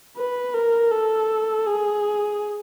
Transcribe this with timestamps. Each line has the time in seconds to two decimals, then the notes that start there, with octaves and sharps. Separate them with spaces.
0.17 B4
0.55 A#4
0.91 A4
1.67 G#4